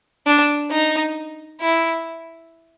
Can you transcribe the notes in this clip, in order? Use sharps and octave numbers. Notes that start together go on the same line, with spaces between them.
D4
D#4
E4